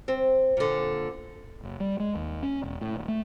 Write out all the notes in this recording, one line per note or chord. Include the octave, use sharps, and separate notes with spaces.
C4
A#2 D3
F#1
G3
G#3
D#2
C#4
E1
A2
D#1
A3